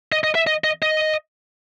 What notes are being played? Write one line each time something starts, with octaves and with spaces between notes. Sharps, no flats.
D#5
D#5
E5
D#5
D#5
D#5